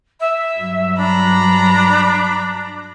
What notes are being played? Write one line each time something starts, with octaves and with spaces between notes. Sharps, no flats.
E5
G2 F#3
D4 A#5 B5